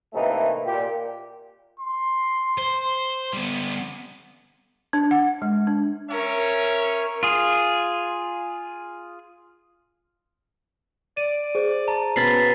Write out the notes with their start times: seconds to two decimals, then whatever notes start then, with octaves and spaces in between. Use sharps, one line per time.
0.13 A2 C3 E3 A3 A#3 D#4
0.66 A#2 G4
1.80 C6
2.58 C5
3.33 G3 B3
4.93 D4
5.11 F#5
5.42 G#3
5.67 D4
6.10 C#4 A#4 C#5 E5
7.23 F4 G#4
11.17 D5 D#7
11.55 G#4 C5
11.88 A5 A#5
12.16 B2 C#4 B5 A6 B6 C7